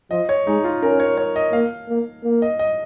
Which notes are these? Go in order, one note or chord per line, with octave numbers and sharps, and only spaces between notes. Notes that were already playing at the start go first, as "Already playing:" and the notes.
F3 D#5
C#5
G#3 D#4
F4
C#4 A#4
C#5
C#5
D#5
A#3 F5
A#3
A#3
D#5
D#5